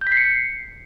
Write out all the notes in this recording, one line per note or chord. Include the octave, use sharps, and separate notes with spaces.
G6
B6
C7
C#7